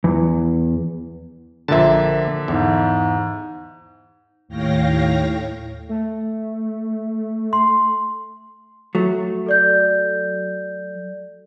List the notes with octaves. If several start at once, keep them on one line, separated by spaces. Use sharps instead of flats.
E2
A#1 A#2 D3 E5 A5
E2 G#2
D#2 A2 C#5 F5 G5 A#6
A3
C6
F#3 A3
A4 D5 G6